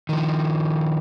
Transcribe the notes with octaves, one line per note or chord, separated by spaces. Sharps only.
D#3 F3